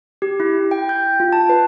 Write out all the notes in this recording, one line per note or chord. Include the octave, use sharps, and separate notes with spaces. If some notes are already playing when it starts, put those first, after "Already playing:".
G4
E4
G5
G6
F4
A5
B4